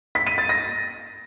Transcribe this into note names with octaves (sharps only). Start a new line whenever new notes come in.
B6
D#7
A6
A#6